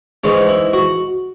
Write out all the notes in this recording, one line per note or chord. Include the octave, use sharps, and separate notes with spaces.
G#2 E3 G#3 C#4
E4
F#4